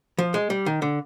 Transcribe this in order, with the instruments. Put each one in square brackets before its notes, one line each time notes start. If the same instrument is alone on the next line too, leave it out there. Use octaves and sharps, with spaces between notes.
[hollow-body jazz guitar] F3
G#3
G3
D#3
D3